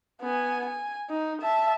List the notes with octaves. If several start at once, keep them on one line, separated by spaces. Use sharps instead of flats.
B3 G#5
G#5
D#4
E5 A5